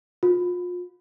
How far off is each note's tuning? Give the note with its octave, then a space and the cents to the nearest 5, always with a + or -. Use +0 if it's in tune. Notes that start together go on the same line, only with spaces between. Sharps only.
F4 +35